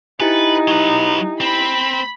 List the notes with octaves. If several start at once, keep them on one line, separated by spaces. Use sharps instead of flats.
D#4 E4 G4 B4 G#5
F#3 B4
C4 B5